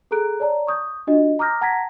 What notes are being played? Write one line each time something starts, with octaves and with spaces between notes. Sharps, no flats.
G#4 A4 A#5 F#6 D7
C#5 D5 A5 A#5
C#6 D#6 G6
D4 F4 F#4 D#5
A#5 D6 D#6 F6 G6 A#6
F#5 A5 A#5 G#6 A#6 B6